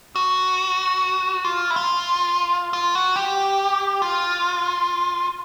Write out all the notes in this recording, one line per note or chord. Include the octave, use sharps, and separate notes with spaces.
F#4
F4
E4
F4
F4
F#4
G4
F4